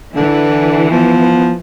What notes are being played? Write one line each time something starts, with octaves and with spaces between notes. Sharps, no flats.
D3 E3
F3 B3